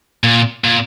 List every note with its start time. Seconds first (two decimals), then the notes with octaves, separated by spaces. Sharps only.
0.24 A#2
0.64 A#2